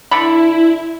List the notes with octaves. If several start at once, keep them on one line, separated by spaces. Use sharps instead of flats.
D3 E4 B5